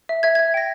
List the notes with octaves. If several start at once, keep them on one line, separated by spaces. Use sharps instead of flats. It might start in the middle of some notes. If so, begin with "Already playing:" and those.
E5
E5 G#6
E5 G#6
G5 A#6